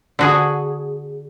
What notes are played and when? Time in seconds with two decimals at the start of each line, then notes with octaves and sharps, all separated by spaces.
0.19 D3 F#4 G#4